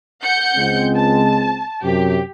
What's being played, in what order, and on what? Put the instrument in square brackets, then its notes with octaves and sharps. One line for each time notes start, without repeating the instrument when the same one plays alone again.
[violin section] F#5 G6 C#7
[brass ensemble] C#2 G#3 C4
[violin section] A5
[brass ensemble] F#2 C3 [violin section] G4